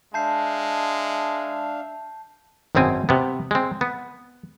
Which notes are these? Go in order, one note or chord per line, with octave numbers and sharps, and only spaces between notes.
G#3 D4 E5 F5 A5 G6 C7
G#1 F#2 B2 C4 G#5
C3 B3
G#3 C4
B3